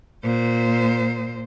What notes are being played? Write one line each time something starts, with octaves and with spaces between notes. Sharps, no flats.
A#2 C5